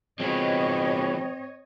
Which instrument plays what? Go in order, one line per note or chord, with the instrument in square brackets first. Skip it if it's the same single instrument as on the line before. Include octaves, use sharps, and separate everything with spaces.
[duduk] B2 [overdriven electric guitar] F3 G#3 [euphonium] C4 [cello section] C#5 D#5